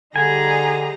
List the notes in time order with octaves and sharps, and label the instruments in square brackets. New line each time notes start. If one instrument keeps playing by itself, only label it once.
[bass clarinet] D3 [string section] G3 D#4 [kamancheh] G#4 A#5 [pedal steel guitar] G#5